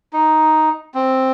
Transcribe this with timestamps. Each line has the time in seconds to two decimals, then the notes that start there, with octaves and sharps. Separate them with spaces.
0.13 D#4
0.94 C4